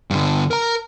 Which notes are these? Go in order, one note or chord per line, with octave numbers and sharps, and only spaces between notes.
G2 D3
A#4 A#5